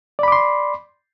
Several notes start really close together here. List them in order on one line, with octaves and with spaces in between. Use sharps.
D5 B5 D6 C6